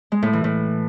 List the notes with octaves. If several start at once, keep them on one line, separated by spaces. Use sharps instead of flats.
G#3
A2
E3
A2